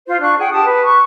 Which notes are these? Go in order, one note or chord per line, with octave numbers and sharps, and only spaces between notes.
F4 C5
D4 C#6 F#6
G#4 F#5 G5 F#6
G4 A5 D#6
B4
C#6 F#6